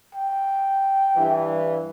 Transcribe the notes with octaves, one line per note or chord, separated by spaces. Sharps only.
G5
G2 E3